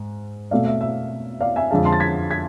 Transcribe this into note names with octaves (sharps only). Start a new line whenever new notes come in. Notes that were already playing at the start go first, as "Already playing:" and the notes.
Already playing: G#2
B2 A3 C4 D5 F5
E5
E5
D5 F5
E5 G#5
F2 D3 G#3 F5 A5
A5 C6
A6
G#6 B6
G#6 B6